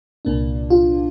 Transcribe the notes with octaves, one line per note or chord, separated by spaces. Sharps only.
C2 A#2 A#3 D4
F4